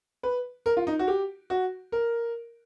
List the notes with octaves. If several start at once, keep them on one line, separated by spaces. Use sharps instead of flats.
B4
A#4
F4
D#4
F#4
G4
F#4
A#4